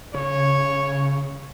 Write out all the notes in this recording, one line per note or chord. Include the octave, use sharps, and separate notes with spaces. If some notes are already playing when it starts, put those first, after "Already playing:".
C#3 C#5